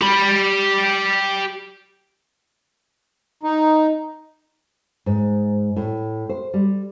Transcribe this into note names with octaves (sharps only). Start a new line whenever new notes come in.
G4 B5
D#4
G#2
A2
C5
G3